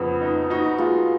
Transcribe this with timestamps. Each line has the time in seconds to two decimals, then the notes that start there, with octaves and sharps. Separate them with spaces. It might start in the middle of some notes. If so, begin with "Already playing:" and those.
Already playing: F2 C#3 B3
0.21 D#4
0.50 D#4 F#4
0.78 G#3 F4